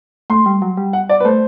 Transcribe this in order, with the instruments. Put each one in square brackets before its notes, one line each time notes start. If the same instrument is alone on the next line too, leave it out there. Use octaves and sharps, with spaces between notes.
[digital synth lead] A3 [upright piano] C6
[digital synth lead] G3
F#3
G3
[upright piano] F#5
D5
B4
[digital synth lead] A3 [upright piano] C5